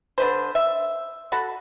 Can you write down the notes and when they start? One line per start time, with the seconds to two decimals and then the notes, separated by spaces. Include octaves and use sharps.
0.18 D3 B4 C5
0.55 E5
1.32 F#4 A4 B5